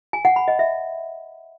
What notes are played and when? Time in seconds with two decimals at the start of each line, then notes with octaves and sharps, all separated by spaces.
0.13 G#5
0.25 F#5
0.36 B5
0.48 D#5
0.59 E5